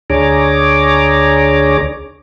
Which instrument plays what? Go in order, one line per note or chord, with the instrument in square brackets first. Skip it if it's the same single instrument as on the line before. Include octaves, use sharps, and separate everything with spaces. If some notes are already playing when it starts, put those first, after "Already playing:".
[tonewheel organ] D2 D4 G#4 C#5 A#5 D6